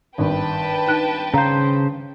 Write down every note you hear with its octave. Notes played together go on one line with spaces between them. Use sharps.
G#1 G2 B4 G5 A5
D#4 F#6
C#3 C5 F5 A#5